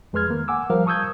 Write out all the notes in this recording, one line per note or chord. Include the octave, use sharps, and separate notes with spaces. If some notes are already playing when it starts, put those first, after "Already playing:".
F2 G#3 B4 C6 F6 G#6
D#3 A#3
F#5 G#5 D6 E6
F3 G3 A#4 C5 F5
A5 C#6 D#6 E6 G6 G#6